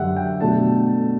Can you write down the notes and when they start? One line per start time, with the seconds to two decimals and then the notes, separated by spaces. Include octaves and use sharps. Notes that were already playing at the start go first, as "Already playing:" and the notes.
Already playing: F#2 D3 G3 E5 F#5
0.16 G5
0.40 B2 F#3 A3 D4 A5